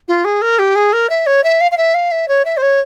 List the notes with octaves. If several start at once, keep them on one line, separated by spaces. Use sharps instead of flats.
F4
G#4
A#4
G4
G#4
A#4
E5
C#5
E5
F5
F5
E5
F5
E5
C#5
E5
C5
C#5